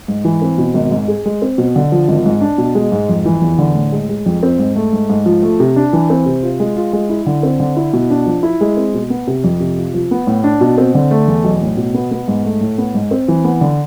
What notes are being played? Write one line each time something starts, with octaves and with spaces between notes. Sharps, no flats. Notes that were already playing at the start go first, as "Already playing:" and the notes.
G#2
E3
C4
B2
G#1
G#2
G#4
G#3
C4
B2
D3
F3
G#1
G#2
D4
B2
G#3
G#2
F2
E3
E2
D3
A2
G#3
G#3
F2
C4
G#2
A3
G#2
G#2
F3
A3
C3
D4
E3
C4
C3
F4
G#3
F4
G#3
E4
D3
C4
D3
E4
B2
D4
F3
E4
G#3
C4
B2
B3
C3
F2
C3
F4
F3
B3
A2
D4
B2
C4
D3
A3
E2
B1
A2
B2
B3
B3
G#2
A3
A2
B3
G#2
C4
E3
B3
D3